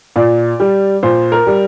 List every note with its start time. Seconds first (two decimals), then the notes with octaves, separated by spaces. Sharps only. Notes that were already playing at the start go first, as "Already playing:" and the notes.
0.16 A#2 D5
0.60 G3
1.03 A#2 C5
1.32 A#4
1.47 G3